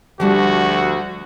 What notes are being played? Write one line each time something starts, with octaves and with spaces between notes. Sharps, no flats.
D2 F3 G3 D4 F#4